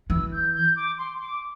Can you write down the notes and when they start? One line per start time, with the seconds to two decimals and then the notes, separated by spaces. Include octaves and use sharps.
0.09 E3 E6
0.32 G6
0.54 G6
0.76 D6
0.98 C6
1.20 D6